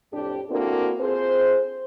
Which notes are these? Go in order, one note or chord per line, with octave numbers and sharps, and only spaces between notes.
F2 A2 D4 G4
A#3 C4 D4 E4 F#4 A4
C4 F4 G#4 C5